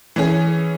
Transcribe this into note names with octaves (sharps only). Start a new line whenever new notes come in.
E3 C#4 G#4